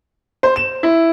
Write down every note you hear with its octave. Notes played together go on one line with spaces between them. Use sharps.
C5
E7
E4